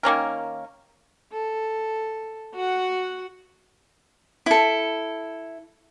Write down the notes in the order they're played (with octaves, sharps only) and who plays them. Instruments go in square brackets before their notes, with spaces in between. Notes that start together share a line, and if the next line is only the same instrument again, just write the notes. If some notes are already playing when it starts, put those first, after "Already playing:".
[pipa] D#3 A#3 C#4 A#4
[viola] A4
F#4 F#5
[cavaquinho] E4 A4